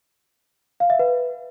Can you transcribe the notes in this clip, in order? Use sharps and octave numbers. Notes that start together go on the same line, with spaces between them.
F5
E5
B4